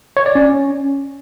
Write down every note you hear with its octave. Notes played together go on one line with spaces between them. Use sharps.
C#5
D5
C#4